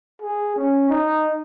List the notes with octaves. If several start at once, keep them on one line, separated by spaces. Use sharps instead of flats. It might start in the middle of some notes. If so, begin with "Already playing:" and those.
G#4
C#4
D#4